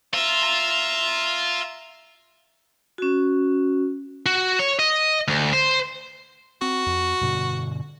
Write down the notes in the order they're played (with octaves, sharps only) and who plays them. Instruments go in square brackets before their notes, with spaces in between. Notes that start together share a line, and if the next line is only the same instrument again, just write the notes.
[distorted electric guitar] F4 [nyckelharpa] E5 A#5
[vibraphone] C#4 F#4
[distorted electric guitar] F#4
C#5
D#5
D2
C5
[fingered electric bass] C4 [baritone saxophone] F#4
[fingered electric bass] F2
G2 B2 D3